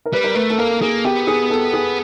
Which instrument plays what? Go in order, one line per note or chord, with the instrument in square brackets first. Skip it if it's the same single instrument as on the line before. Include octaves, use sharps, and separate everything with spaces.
[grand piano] A#4
[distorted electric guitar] G3 [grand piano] B4
[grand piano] A#4
[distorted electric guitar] A3 [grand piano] B4
[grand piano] A4
[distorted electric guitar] A#3 [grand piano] A#4
[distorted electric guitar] A#3 [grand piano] G#4
[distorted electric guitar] B3 [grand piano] G4
[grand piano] G#4
A4
G#4